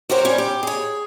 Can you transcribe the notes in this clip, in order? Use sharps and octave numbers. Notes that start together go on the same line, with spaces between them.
F#4 G4 A#4 C5 C#5
G3 C#4 C5
G4
G#4 C#5